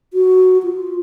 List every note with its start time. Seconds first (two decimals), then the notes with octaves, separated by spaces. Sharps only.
0.13 F#4
0.63 F4